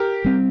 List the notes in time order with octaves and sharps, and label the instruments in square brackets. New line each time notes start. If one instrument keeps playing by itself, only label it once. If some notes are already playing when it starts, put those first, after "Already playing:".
Already playing: [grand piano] G4 A#4
[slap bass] G3 C4